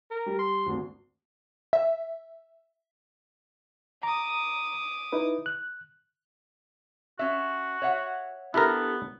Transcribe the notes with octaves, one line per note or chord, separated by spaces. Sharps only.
A#4
G3
C6
G#1 D2
E5
A#5 D6 D#6
D#4 E4 B4
F#6
C#4 F#4 E5
C#5 E5 F#5
B3 D4 E4 G4 A4 A#4